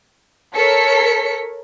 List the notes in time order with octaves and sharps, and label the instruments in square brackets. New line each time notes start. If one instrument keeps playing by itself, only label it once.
[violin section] A4 A#4 C#5 B6 C#7